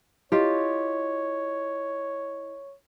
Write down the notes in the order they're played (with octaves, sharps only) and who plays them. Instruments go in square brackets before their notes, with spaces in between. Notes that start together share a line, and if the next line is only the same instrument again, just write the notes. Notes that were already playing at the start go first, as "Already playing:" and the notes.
[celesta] E4 D#5 [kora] F4 G4 [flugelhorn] C#5